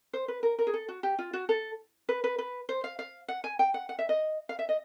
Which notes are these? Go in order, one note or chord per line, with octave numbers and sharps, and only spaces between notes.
C5
B4
A#4
A#4
G#4
A4
F#4
G4
F4
F#4
A4
B4
B4
B4
C5
F5
F5
F#5
G#5
G5
F#5
F#5
E5
D#5
F5
E5
D#5